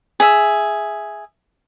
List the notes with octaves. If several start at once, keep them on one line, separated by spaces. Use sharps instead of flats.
G#4 E5